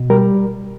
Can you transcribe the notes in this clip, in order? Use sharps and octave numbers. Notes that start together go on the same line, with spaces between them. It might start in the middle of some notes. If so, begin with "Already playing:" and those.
Already playing: B2
G3 A#4